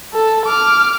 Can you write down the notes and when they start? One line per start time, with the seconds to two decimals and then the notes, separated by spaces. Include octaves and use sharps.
0.14 A4
0.46 D6 F6